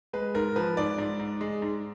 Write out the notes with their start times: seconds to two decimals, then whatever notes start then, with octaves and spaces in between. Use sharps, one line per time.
0.13 G#3 B4
0.35 G#2 A#4
0.56 F3 B4
0.77 G#2 D5
0.98 G#2
1.20 G#2
1.41 G#3
1.62 G#2